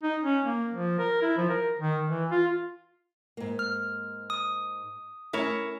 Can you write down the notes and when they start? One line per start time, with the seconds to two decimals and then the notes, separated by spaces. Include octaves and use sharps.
0.03 D#4
0.24 C#4
0.45 A#3
0.74 F3
0.99 A#4
1.22 E4
1.37 F3
1.50 A#4
1.79 D#3
2.09 E3
2.31 F4
3.37 G#2 A#3
3.59 F6
4.30 D#6
5.33 A3 C#4 E4 A#4 C#5